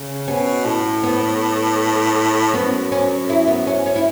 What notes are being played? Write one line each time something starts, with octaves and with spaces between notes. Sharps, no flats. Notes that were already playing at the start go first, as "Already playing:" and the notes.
Already playing: C#3
B2 C#4
A2
B3
F#2 B3
C#4
E4
B3
C#4
C#4
E4